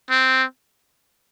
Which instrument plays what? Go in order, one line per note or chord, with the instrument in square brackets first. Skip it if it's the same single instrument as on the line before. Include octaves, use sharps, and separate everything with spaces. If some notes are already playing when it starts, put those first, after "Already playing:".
[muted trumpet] C4